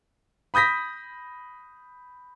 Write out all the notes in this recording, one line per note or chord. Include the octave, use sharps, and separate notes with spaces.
B5 D#6 G6 A#6 B6